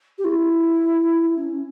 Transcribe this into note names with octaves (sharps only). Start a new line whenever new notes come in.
G4
E4
C#4